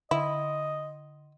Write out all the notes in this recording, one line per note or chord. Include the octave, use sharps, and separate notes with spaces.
D3 E4 D#5